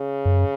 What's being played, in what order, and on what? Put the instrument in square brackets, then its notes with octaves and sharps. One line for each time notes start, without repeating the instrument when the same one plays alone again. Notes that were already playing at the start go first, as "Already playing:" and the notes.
Already playing: [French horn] C#3
[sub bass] F#2